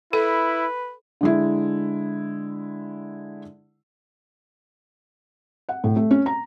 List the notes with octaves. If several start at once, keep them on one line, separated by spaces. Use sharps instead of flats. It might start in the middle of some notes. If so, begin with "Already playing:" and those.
E4 A4 B4
D3 G#3 E4
F#5
A2
A3
C#4
A#5